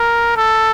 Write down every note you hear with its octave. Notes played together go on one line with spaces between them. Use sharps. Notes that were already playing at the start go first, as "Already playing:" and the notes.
Already playing: A#4
A4